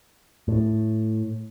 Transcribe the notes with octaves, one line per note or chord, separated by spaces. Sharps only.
A2